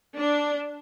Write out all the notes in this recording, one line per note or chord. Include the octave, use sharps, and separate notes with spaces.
D4